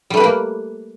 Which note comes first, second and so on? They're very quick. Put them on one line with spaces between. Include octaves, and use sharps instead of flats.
G3 A3 B4 G4 A#3